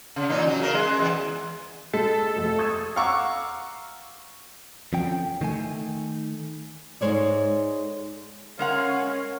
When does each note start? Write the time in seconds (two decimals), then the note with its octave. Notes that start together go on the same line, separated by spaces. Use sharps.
0.16 C#3
0.29 A#2 E3 D#4
0.47 F#3
0.60 C#3 A#4
0.74 G#3
0.99 E2 E3 B3
1.93 G#3 A4 B6
2.37 F2 A3
2.58 C#6 D#6 G#6
2.96 F5 F#5 A#5 C#6 D6 E6
4.93 F2 F3 C#4 G5
5.41 D#3 A3 G#5
7.01 G#2 C#3 G#3 C#5 D5
8.59 G#3 C#4 A#4 F5 F#5